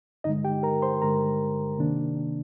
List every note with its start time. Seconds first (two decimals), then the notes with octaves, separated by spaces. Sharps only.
0.24 G2 D3 G#3 D#4 D#5
0.44 G4 G5
0.63 A#4 A#5
0.82 C5 C6
1.02 G2 D3 G#3 A#4 A#5
1.78 C3 D#3 A#3 D4